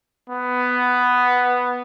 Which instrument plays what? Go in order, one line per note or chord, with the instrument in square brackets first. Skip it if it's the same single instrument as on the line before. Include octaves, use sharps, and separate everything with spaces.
[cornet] B3